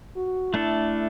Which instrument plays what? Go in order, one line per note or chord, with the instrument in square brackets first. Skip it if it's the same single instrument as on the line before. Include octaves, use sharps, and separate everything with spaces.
[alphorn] F#4
[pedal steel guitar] A3 D4 A4 [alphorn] E4